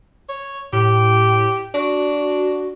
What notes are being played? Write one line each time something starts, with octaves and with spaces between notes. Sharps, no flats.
C#5
A2 G4
D4 F#4